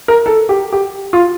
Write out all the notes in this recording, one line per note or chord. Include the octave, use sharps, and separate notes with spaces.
A#4
A4
G4
G4
F4